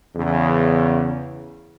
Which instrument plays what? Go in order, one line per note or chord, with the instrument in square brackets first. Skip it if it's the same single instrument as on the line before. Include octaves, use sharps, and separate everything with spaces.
[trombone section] E2 C#3